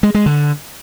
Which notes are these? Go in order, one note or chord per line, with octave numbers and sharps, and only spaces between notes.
G#3
G#3
D3